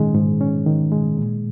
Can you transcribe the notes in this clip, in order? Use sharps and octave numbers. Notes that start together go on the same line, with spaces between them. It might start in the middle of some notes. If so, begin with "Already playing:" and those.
Already playing: G#2 D#3 G#3 C#4
G#2
C#4
D#3
G#3
A#2